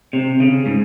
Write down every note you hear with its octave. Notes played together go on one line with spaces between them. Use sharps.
C3
C#3
G#2